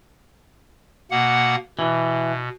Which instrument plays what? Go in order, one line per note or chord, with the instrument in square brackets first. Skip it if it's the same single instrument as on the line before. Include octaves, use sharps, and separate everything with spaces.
[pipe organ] B2 A#3 F#5
[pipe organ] B2 [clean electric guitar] E3